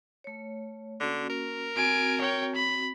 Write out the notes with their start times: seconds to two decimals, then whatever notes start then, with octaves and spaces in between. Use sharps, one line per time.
0.24 A3 C#5
1.01 D3 A#3 C#4 F#4
1.30 A#4
1.76 C4 F#4 G#5 D7
2.21 C#5 G5
2.55 B5